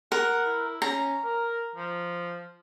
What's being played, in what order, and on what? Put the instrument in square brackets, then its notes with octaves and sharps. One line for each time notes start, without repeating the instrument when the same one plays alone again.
[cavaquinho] A#4 [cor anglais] F#5
[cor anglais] E4
[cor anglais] C#4 [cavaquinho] A#5
[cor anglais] A#4
F3